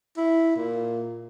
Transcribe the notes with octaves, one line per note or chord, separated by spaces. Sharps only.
E4
A#2